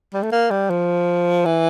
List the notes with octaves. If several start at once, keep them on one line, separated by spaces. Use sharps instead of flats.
G3
A3
A#3
G3
F3
E3